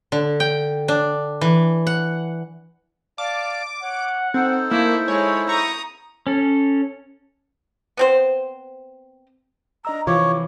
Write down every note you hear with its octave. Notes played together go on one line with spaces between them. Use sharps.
D3
G5
D4
E3
F#5
D5 F5 A5 D6
C#5 F#5
C4 D#4 A4 C5
A3 A#3 E4
G#3 E4 C#5
A#5 C#6 D#6
C#4 A4
B3 C4 C5
D4 D#5 A#5 E6
C3 E3 F3 F4 C#5 D6